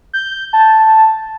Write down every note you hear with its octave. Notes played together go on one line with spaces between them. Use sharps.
G6
A5